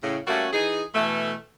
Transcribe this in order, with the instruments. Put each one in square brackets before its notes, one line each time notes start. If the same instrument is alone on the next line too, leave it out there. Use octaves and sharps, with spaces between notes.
[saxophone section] A2 C#3
G3 A3 A#3 C#4 F#4
E3 D#4 G#4
B2 E3 A3